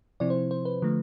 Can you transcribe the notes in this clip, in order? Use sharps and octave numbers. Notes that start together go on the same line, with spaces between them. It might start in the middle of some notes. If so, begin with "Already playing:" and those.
C3 F3 C4 E4 D5
C5
C5
B4
D3 F3 A3